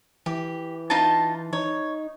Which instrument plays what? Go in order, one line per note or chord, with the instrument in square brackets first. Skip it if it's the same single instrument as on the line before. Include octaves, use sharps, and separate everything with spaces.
[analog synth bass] E3 [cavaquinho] G4
[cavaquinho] D#4 F4 A5
[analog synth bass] D#4 [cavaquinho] C#5